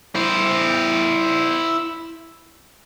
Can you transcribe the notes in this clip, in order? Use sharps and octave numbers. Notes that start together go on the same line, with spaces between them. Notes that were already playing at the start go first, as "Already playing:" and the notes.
E4 C5